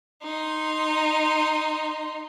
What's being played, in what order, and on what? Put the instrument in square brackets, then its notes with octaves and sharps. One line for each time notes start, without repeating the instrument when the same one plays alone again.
[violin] D#4 C6